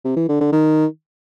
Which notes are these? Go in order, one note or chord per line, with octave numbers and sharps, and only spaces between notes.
C3
E3
D3
D3
D#3